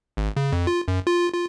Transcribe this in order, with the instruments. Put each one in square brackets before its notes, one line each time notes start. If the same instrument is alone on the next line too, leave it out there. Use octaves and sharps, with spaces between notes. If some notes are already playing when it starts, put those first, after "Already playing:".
[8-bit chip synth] G#1
C#3
F2
F4
F#2
F4
F4